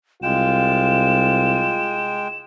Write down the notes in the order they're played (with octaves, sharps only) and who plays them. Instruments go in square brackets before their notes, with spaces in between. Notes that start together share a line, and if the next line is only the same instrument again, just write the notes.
[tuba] C2 [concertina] G#3 G5 [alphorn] F4 [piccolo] E7